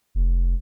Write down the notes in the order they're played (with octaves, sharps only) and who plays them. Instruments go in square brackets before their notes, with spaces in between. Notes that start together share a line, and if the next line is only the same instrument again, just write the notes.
[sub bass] F1